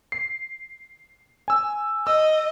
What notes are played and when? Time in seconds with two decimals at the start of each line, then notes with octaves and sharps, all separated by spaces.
0.12 C7
1.48 G#5 E6
2.07 D#5 E6